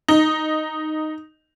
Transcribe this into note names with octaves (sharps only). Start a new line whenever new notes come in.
D#4